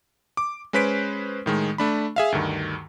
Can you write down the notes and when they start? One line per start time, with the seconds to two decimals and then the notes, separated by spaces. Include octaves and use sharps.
0.37 D6
0.73 G#3 C#4 B4 C5 B6 D7
1.46 A2 D#3 G#3
1.78 A3 D4 B5
2.16 G#4 E5 F5
2.32 D2 G2 D#3